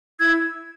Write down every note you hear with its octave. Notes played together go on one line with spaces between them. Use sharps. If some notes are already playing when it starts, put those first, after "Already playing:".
E4 E6 G#6